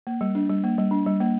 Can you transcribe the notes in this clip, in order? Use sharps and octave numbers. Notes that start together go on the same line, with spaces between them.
A#3
G3
D4
G3
A#3
G3
D4
G3
A#3